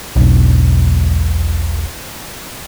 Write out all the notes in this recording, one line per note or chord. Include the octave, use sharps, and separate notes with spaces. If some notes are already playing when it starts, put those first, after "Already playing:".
E1 B1